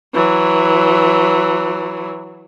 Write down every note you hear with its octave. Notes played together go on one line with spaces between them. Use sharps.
E3 F#3